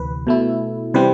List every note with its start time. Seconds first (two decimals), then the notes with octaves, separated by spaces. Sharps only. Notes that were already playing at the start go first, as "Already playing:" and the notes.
Already playing: D2 C3 E3 B4
0.27 B2 A3 E4
0.94 C3 E3 G3 C4 B4